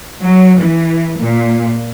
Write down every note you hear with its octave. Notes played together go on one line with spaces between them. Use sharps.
F#3
E3
A#2